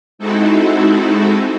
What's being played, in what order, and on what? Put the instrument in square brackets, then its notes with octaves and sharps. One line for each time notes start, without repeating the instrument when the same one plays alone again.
[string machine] G#3 C4 D#4 E4 F#4 A4